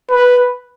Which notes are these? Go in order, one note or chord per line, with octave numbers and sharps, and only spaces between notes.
B4